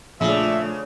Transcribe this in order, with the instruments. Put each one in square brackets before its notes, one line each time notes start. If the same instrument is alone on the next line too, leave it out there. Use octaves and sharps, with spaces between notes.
[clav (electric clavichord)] A#1 [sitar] C#3 [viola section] F3 A3 D4 [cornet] E5